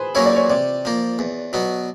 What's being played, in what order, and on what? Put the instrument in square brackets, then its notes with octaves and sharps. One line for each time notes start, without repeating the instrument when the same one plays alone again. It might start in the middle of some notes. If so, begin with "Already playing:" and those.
Already playing: [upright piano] G#4 B4 C5
[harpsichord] F#3 A#3 C#4 E4 [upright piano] C#5
[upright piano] D5
C#5
[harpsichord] C3 [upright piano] D5
[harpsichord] F3 A#3
E2
B2 F#3 B3